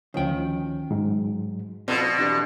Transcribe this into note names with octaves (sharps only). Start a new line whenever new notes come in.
D2 D#3 F3 C#4 G5
G#2 F#3
B2 C4 A4 C5 D5 C6
E2 D4 G4